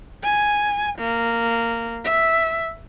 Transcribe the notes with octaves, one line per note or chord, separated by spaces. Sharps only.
G#5
A#3
E5